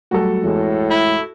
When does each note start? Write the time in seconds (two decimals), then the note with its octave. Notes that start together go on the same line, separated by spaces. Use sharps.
0.11 F#3 G3 A3 F#4 A4
0.44 E2 A2 G#3
0.90 E4